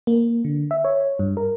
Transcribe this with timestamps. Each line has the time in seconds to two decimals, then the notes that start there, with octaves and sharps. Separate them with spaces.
0.07 A#3
0.45 D3
0.71 E5
0.84 C#5
1.19 G2
1.37 A#4